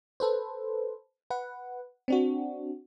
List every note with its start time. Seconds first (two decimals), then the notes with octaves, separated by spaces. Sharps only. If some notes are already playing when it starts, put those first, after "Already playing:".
0.20 A4 B4 C5
1.30 B4 F#5
2.08 C4 D4 F#4